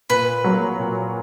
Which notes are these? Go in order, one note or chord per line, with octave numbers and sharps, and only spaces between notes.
A#2 B4
F#3 A#3
A#2